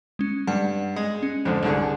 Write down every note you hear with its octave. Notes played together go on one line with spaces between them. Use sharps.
G#3 C#4
G2 F#5
G#3 D#5
C#4
F2 G#2 D3
C2 D3 G#4